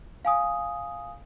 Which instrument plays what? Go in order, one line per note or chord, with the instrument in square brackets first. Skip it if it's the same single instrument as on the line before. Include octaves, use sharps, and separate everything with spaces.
[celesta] F5 G#5 D#6